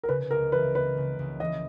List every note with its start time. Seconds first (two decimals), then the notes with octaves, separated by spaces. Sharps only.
0.03 A#4
0.08 C#3 B4
0.31 C#2 A#4
0.52 E3 B4
0.74 A#3 B4
0.97 C#3
1.19 C#2
1.40 E3 D#5